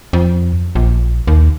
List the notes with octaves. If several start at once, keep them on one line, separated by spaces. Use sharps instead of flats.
F2
A#1
D#2